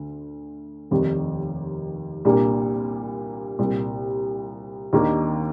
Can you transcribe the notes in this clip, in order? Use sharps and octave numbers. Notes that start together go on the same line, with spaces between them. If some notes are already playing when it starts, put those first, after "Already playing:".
Already playing: D2 D3
F1 D#2 D#3 G3
C2 A#2 G3 A#3 D4
C2 A#2 G3
D#2 D#3 A#3 D4